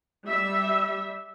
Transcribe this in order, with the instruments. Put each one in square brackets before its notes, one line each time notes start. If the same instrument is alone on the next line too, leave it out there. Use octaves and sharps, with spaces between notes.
[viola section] G3 E5